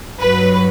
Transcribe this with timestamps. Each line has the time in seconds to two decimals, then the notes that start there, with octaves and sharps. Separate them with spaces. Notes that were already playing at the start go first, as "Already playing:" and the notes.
0.19 G2 F#3 B4